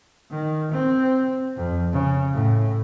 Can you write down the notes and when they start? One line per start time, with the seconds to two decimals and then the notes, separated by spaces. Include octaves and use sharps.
0.30 D#3
0.72 C4
1.56 F2
1.93 C#3
2.33 A2